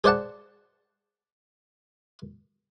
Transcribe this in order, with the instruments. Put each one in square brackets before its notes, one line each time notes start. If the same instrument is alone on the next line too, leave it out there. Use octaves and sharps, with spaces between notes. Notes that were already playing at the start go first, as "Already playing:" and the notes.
[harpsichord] G#4 C5 D5 F#5 A5